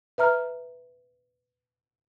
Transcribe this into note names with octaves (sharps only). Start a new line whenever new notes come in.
B4 E5 A#5 F6